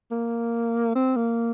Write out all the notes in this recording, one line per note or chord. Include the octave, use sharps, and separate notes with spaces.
A#3
C4
A#3